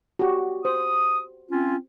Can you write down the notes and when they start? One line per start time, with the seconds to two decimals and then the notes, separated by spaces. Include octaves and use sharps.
0.19 F#4 G4
0.65 C5 D#6
1.51 C4 C#4 F4